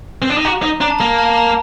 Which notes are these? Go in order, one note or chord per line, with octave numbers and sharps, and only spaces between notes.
C4
D4
D#4
F#4 A#5
D#4
D4 A#5
A5
A#3 A#5
A5
A#5